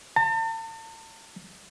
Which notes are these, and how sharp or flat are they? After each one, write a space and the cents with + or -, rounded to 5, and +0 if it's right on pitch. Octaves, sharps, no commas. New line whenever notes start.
A5 +40